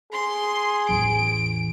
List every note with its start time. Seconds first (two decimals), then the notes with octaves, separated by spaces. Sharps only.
0.12 G#4 C6
0.89 A1 E2 D7